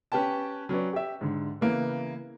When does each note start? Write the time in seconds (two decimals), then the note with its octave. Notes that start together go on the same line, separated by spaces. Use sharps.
0.12 C#4 G4 B4 G5 A5
0.69 F#3 C#4 B4 D5
0.93 G4 E5
1.21 G#2 D3
1.61 C#3 E3 A#3 B3